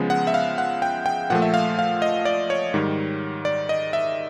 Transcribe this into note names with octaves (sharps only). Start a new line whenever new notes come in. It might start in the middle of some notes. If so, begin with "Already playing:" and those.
Already playing: C#3 F3 G#3 B3
F#5
E5
F5
F#5
G5
G5
A#2 F3 A3 F#5
E5
F5
F5
D#5
D5
C#5
G#2 D#3 G3
D5
D#5
E5